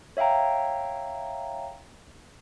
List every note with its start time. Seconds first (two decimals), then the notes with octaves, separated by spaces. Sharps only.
0.17 C#5 E5 F5 G5 A#5